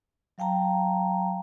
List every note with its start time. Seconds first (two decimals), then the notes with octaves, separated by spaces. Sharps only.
0.38 F#3 F5 G5 A5 A#5